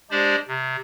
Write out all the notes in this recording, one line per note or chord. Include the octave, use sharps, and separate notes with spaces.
G#3 D4 G4 C5 D5
C3